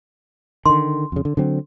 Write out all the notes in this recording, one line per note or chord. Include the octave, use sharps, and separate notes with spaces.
D3 D#3 C6
F2 C#3
D3
D3 F#3 C4